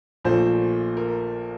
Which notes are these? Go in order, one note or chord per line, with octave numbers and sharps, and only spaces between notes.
A#1 A#2 F3 A3 C5
A#4